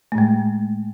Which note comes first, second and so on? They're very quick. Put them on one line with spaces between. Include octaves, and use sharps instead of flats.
A3 A2 G#3